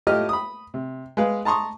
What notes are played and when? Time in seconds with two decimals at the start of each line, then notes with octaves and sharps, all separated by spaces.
0.07 A2 F4 G4 D#5 F6
0.29 B5 D#6
0.74 C3
1.17 G#3 B4 F5
1.45 A5 A#5 C6 C#6 D#6